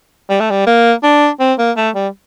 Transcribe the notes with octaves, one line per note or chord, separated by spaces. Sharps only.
G3
A3
G3
A#3
D4
C4
A#3
A3
G3